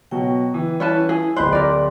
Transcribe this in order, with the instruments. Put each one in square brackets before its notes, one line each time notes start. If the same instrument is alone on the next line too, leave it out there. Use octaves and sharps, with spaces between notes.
[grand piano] B2 F#3 F#4 [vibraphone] G5
[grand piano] E3
[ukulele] C#4 B4 A5 [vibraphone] E4
[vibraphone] E4 [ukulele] G#4
[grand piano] D1 B5 F#6 [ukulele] C5 [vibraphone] D#5
[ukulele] A#4 D5 [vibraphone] C6